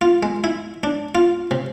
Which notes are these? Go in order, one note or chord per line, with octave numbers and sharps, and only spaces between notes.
F4
G#3
E4
D4
F4
C3